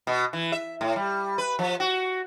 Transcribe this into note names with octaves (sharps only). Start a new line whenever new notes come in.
B2
E3
E5
A2
G3
B4
F3
F#4